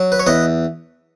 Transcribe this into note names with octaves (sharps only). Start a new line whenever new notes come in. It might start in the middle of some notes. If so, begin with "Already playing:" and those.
Already playing: F#3
B4
C#5
E2 B4 D#5